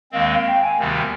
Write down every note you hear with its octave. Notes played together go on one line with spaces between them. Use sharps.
D#2 D#3 G#3 C4 F5
F5
G5
G#5
D2 C3 D#3 G3 B3